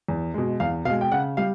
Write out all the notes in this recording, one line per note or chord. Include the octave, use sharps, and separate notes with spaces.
E2
B2 G#3
E2 F5
B2 G#3 F5
G5
C#3 F#5
G3 F5